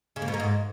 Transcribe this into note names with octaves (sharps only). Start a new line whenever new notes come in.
C#3
A#3
B2
A#3
G#2